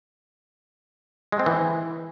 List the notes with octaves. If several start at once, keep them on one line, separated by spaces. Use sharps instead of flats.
G#3
C4
E3